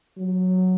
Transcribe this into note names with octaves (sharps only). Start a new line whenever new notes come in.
F#3